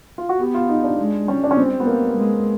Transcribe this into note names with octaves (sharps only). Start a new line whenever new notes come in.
F4
F#4
B3 G4
F4
D#4
D4
G#3
G3 C#4
D4
C#4
C4
B3
A#3
G#3